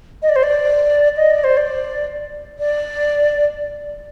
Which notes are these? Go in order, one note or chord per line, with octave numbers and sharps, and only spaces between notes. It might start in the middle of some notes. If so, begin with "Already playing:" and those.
D#5
D5
C5
D5
D#5
D5
C5
D5
D5